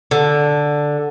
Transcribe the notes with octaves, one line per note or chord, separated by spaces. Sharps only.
D3